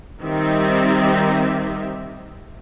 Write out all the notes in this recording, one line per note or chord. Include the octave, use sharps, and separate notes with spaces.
D#3 G3 C4 D#4 G4 E5